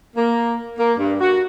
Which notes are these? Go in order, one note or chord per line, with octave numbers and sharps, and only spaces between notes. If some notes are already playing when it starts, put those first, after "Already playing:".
A#3
A#3
G2
F#4